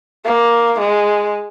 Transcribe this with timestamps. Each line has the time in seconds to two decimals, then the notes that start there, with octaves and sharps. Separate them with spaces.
0.25 A#3
0.80 G#3